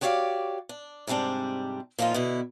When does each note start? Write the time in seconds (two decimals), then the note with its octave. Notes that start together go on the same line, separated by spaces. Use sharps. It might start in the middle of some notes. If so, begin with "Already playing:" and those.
0.01 F#4 G4 C#5 D5 E5 F5
0.69 D4
1.07 G#2 C3 G3 C4 D4
1.99 A#2 F3 A#3 D#4 F4
2.14 B2 D3 E4